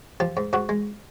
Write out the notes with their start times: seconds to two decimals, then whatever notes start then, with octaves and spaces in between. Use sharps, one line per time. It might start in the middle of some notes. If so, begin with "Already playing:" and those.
0.20 F3 G4
0.37 G#2
0.53 G#2 F#4
0.69 G#3